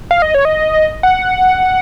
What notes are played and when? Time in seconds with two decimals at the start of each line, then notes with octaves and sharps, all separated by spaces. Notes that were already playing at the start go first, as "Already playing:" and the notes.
0.11 F5
0.22 D#5
0.34 C#5
0.45 D#5
1.03 F#5